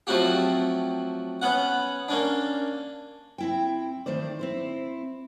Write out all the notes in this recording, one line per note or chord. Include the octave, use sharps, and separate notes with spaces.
F3 F#3 A3 C4 F#4 G4
B3 C#4 F#5
A#3 C#4 D4
C4 E4 G5
D#3 A3 C5 D5
C4 E4 C5